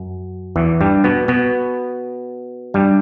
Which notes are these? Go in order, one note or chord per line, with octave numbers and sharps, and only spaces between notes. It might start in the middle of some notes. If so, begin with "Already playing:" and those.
Already playing: F#2
E2 E3
G2 G3
B2 B3
B2 B3
G2 G3